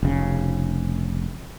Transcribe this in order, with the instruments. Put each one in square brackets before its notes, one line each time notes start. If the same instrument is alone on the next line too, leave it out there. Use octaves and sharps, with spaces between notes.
[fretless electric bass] F1 C#3